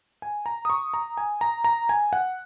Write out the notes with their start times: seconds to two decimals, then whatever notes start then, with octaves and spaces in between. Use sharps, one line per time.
0.22 G#5
0.46 A#5
0.65 D#6
0.70 C#6
0.94 A#5
1.17 G#5
1.41 A#5
1.64 A#5
1.89 G#5
2.13 F#5